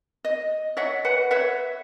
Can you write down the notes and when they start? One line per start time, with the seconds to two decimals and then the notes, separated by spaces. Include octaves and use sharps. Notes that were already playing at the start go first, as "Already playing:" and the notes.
0.24 D#5
0.77 C#5 D#5 E5 F#5
1.05 B4 F#5
1.31 B4 C#5 E5 F#5